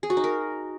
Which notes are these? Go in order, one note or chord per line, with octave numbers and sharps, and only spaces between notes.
G#4
F#4
D#4
A#4